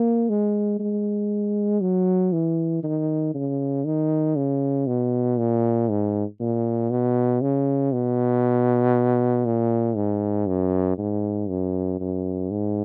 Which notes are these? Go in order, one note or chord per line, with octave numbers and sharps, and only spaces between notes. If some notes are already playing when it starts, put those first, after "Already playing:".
Already playing: A#3
G#3
G#3
F#3
E3
D#3
C#3
D#3
C#3
B2
A#2
G#2
A#2
B2
C#3
B2
A#2
G#2
F#2
G#2
F#2
F#2
G#2